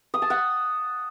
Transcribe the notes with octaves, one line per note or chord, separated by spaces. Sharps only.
D#6
A5
F#5